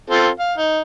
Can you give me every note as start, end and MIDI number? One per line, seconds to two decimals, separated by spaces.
0.10 0.28 60
0.10 0.28 65
0.10 0.28 69
0.39 0.54 77
0.58 0.81 63